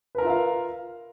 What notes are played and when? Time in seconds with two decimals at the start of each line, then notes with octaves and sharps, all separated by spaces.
0.15 B4
0.18 A#4
0.22 F4
0.26 E5
0.30 F5